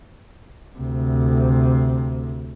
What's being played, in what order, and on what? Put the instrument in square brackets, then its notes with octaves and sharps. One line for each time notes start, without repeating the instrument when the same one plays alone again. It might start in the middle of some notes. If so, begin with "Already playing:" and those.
[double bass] D2 C3